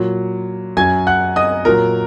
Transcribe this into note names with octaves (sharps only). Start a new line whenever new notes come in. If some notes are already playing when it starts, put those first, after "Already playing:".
Already playing: A#2 F#3
F#2 F#3 G#5 G#6
F#5 F#6
D#5 D#6
A#2 F#3 A#4 A#5